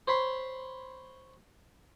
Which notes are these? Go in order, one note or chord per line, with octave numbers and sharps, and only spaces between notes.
C5 C#5 B5 C6